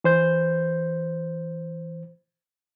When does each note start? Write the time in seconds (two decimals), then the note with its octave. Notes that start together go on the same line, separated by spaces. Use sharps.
0.04 E3 C5 G6